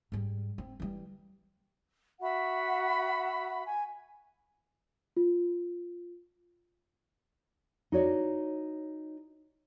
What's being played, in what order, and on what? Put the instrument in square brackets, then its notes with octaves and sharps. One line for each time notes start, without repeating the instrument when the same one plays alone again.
[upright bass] G#2 G3
C4
E3 G3
[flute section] F#4 E5 F#5 B5
G#5
[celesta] F4
[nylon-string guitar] D#4 F#4 C#5 D5